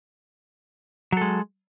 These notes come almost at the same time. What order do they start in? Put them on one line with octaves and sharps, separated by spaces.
F#3 A4 G#3